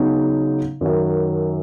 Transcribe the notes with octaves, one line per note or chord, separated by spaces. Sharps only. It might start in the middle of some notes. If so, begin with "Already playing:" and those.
Already playing: C#3 F#3 B3 D#4
F#2 D#3 F#3